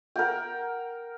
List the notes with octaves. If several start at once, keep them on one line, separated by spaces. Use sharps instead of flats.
A#4 F#5 G5